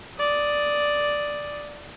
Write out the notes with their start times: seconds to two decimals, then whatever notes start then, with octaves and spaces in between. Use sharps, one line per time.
0.18 D5 D#6